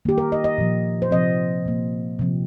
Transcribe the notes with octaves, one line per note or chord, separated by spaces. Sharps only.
D#3 A#3 G4
A#4
D#5
D#5
A#2 F3 A#3
C5
C3 F3 C4 D#5
A#2 A#3
C3 F3 C4